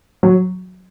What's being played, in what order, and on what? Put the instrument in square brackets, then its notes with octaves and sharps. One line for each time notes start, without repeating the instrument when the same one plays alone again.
[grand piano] F#3